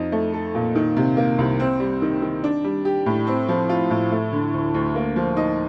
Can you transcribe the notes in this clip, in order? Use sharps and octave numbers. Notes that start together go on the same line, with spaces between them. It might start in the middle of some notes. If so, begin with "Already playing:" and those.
Already playing: F2 D#4
A3
A4
A#2
D#3
C3
A#3
C2
C4
G3
D#3
D#3
D4
G3
G4
A2
C4
F3
F4
A2
A3
D3
D2
D2
A#3
F3
D#4